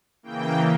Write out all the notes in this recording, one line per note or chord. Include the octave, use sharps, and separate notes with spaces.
C#3 E3 A#3 G5